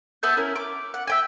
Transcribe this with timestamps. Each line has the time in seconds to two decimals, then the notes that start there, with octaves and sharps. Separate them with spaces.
0.23 B3 E5 A5 G6
0.37 C#4 E4 A#4
0.56 D6
0.94 F#5
1.07 E5 G5 G#5